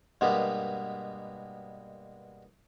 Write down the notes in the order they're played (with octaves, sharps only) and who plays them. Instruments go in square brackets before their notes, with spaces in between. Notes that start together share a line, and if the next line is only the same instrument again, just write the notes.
[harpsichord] G2 B2 G#3 A#3 B3